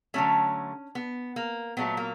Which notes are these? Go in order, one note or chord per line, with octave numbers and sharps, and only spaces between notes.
D3 F#3 A3 C#4
B3
A#3
A#2 F#3 A3 B3
A#3